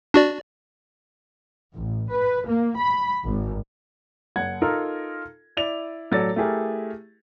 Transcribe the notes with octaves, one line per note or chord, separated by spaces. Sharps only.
D4 F#4 D5
A1
B4
A#3
B5
G#1
F#1 F#5 G#6
D#4 F4 A4 A#4
E4 D5 F7
A1 F#3 A4 D5 A6
A3 E4 G4 G#4 A#4